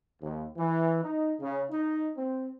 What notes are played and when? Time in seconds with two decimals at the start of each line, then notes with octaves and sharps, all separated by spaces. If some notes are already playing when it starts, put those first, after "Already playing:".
0.21 D#2
0.57 E3
1.03 D#4
1.40 C#3
1.70 D#4
2.17 C4